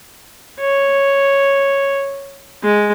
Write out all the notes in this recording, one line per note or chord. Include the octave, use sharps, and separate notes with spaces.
C#5
G#3